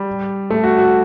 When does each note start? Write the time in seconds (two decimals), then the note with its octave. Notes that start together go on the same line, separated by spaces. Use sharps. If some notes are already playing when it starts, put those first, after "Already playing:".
Already playing: G3
0.50 A3
0.64 F#4
0.78 F#4